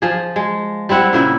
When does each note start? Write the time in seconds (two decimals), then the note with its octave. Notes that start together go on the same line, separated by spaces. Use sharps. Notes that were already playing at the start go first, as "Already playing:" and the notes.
0.02 F3 G#4
0.36 G#3
0.89 G3 C4 E4 F#5
1.13 A#2 C#3 E4